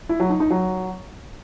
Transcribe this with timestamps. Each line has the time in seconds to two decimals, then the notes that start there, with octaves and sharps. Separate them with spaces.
0.09 E4
0.20 F#3
0.30 D#4
0.40 D#4
0.50 F#3